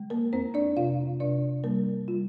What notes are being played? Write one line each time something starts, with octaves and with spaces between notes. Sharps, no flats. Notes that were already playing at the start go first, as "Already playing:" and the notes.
Already playing: D3 G#3
A#3 A#4
F2 C4 C5
D4 D5
C3 F4 F5
C3 D4 D5
G3 A#3 A#4
G3 F4